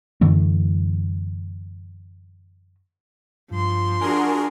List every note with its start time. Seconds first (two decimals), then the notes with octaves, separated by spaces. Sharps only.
0.21 F#2 D3 E3 A3
3.51 G2 F3 C6
4.01 D4 F#4 G#4 A#4 G#5